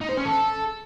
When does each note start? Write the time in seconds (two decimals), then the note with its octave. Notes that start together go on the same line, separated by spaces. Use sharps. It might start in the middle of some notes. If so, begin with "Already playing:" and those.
0.01 D#4
0.09 C5
0.17 C#4
0.25 A4